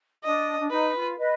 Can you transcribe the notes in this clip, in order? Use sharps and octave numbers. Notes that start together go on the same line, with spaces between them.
D4 D#5
D4
D#4 B4
F4
B4 D#5